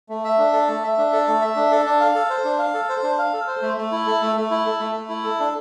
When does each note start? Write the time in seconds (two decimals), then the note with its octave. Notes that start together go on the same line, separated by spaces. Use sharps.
0.09 A3
0.24 E5
0.38 D4
0.53 A4
0.68 A3
0.83 E5
0.97 D4
1.13 A4
1.27 A3
1.41 E5
1.56 D4
1.71 A4
1.85 D4
2.00 F5
2.15 A4
2.30 C5
2.44 D4
2.59 F5
2.74 A4
2.89 C5
3.03 D4
3.19 F5
3.33 A4
3.47 C5
3.62 A3
3.77 A3
3.92 E4
4.06 A4
4.22 A3
4.36 A3
4.51 E4
4.66 A4
4.80 A3
4.96 A3
5.09 E4
5.24 A4
5.40 D4